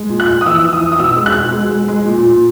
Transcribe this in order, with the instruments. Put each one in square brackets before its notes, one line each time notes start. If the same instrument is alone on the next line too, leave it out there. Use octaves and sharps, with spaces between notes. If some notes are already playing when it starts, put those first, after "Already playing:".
Already playing: [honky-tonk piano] G#3
A#2
F#6
A#2
D#6
E3 E6
E3
D#6
E3
D#6
B2 E6
G#3
F#6
B2
G#3
G#3
G#3
A#2
A#2